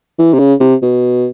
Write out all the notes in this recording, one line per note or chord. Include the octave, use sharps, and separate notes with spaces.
E3
C3
C#3
C3
B2